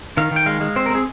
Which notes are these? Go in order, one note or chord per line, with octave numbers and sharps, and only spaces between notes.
D#3 F5
D#3 G5
G#3 F5
G#3
C4 C5
A#4
C4 G#4